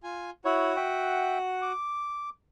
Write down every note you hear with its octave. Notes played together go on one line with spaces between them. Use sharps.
F4 G#5
E4 F#4 C#5 F#5
E5 G5
D6